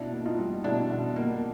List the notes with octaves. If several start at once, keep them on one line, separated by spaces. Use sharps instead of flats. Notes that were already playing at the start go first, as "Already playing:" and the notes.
Already playing: B2 D4 E4
A#3
D#4 F4
G3
B2 D4 E4
B2
A#3